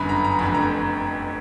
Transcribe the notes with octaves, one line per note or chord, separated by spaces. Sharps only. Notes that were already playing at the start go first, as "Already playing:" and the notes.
Already playing: G1 F#2 D3 B5
A#5
A#5
F1 F2 D3 B5
A#5